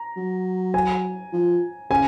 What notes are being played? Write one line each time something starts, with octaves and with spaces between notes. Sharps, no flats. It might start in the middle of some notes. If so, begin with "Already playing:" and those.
Already playing: A#5
F#3
G#5
F3
C#3 G#5